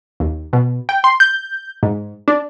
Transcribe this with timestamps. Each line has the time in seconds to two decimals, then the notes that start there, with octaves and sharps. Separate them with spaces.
0.20 D#2
0.53 B2
0.89 G5
1.04 C6
1.20 G6
1.83 G#2
2.28 D4